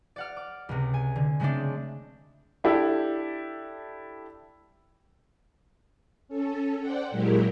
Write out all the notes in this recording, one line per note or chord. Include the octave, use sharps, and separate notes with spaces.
D5 F#5 F6
D6
C#2 C3
G#5
D3
C#3 G#3 A3 C4 D4
D4 E4 G4 A4
C#4 A4
C5 D5 F#5 G5
A#2 F#3 G#3 E4 G4 A#4